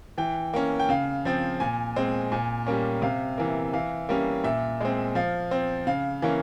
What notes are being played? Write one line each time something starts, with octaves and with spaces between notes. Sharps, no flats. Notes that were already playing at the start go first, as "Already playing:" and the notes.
E3 G5
A#3 C#4
G5
C#3 F5
F3 C4
A#2 G#5
G#3 C4
A#2 G#5
G3 A#3 C#4
C3 F5
E3 A#3
E3 F5
G3 A#3 C#4
A#2 E5
G#3 C4
F3 F5
C4
C#3 F5
E3 A#3 C#4